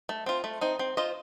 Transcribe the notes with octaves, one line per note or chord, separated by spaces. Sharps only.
A3
C4 F4
A3
C4 D#4
C4
F4 C5 D#5